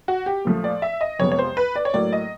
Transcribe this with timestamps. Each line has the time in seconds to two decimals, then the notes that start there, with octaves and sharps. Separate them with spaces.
0.08 F#4
0.26 G4
0.45 A#2 F3 A3
0.64 D5
0.82 E5
1.01 D#5
1.19 F2 C3 F3 G#3 B3 C#5
1.32 C#5
1.39 C5
1.57 B4
1.76 D5
1.85 C#5
1.94 A2 F#3 A#3 D5
2.13 D#5